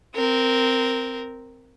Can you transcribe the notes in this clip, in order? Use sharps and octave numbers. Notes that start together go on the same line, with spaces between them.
C4 A#4